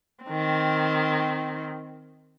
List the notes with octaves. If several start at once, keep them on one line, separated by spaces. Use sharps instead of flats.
D#3 C4